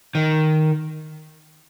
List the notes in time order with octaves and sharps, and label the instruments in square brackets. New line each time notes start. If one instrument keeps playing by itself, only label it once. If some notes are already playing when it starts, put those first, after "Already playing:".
[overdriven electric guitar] D#3